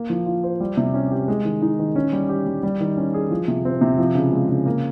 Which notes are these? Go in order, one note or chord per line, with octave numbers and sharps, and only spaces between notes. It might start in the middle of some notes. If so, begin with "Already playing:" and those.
Already playing: A#3
F3
F4
C5
G3
C3
C#4
G4
G#3
D#3
D#4
D#3
C#4
G3
G4
G3
G3
D#3
C#4
G#4
F3
C3
C4
C3
F3
C#3
G#3
C#3
A#3